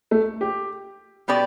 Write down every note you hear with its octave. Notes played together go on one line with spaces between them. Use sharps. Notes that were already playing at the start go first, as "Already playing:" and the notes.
A3
G4
B2 B3 G4 D5